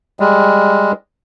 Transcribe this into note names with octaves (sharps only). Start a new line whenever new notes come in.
G3 G#3